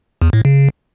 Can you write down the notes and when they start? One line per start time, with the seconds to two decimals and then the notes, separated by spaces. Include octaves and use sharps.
0.22 E2
0.33 A2
0.45 C#3